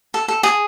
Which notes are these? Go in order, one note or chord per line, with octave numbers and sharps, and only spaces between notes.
A4
A4
G#4